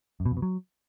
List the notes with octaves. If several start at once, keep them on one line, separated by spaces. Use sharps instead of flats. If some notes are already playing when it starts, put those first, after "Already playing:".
F#2
B2
F2
B2
F#3